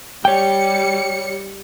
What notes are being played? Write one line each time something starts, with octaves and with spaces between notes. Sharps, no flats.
G3 C#5 G5 C#7